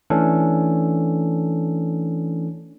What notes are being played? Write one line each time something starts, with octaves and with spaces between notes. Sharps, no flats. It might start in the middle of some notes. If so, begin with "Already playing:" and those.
E3 A3 C#4 D4 A4